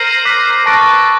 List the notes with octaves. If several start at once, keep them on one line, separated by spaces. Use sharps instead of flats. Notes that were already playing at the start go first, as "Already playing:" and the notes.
Already playing: A#4 C5 A#6 D#7 F#7
D6 F#6 B6
A4 B4 A5 C#6 F#6 A#6 D7